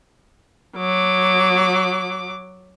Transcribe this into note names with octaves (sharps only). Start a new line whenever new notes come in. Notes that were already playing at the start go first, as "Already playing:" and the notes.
F#3 D6